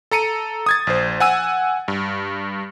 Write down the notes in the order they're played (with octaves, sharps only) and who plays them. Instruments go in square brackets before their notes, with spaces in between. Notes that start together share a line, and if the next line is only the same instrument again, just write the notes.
[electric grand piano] A4 A#5 C#7 D#7
D#6 G#6 A6
A#1 C5
F#5 G#5 E6 D#7
G2